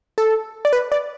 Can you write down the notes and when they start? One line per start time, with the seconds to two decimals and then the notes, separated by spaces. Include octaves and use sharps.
0.18 A4
0.65 D5
0.73 B4
0.92 D5